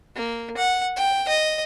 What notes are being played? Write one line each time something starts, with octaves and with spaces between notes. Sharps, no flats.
A#3
F#5
G5
D#5